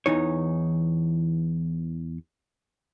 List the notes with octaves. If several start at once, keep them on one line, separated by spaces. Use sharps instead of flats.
E2 E3 D#4 C#5